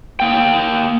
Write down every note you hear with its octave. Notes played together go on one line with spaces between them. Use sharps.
A#3 G5